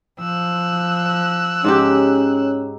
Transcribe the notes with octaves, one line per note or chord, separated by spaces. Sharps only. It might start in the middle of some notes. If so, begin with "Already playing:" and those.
F3 E6 F#6
G#2 C#4 D#4 G4